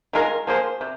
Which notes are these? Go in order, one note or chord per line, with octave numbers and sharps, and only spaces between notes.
D#3 G#3 F4 A#4
F3 A#3 G#4 C5
C3